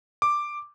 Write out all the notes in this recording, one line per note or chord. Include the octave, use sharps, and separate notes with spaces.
D6